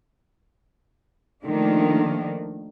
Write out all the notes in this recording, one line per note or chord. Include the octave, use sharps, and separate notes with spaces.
D#3 F3 A3 A#3 D4